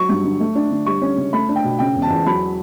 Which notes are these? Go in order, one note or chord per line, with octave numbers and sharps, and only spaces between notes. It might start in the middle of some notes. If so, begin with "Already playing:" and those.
Already playing: F#3 C#6
G2
D3
A3
D4
D3
G3 C#6
C#4
C#3
A3 B5
D4
G5
B2
C#3 G5
E1
A5
E2
F#3 B5